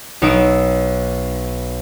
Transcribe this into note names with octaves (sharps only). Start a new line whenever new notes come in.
B1 D#4 E6 D7